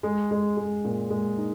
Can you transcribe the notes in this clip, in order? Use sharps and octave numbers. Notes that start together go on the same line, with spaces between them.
G#3
G#3
G#3
A#2
G#3
D#4